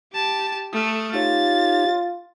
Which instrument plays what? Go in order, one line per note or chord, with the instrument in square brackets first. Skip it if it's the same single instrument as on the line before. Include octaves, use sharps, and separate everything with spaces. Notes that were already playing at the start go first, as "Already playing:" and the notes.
[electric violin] G4 A5
[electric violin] A3 [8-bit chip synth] D#6 F6
[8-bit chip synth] D#4 G4 C#5 [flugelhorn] F4 [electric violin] A6